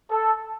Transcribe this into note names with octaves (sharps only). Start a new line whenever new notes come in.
A4